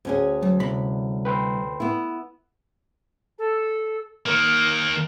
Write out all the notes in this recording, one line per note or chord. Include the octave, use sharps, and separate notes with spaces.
D2 C#4 G#4
F#3
C2 B5
B4 G5 C6
B3 E4
A4
D#3 A#3 A#4